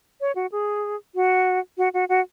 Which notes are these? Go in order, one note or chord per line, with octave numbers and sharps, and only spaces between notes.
C#5
F#4
G#4
F#4
F#4
F#4
F#4